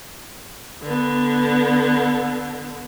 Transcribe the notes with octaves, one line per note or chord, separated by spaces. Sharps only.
D3 B3